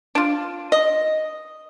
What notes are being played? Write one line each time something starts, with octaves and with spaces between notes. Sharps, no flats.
D4 F4
D#5